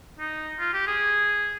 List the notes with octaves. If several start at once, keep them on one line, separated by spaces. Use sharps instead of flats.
D#4
F4
G4
G#4